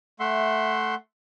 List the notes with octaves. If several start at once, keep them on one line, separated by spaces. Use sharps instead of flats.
A3 E5 F#5 C6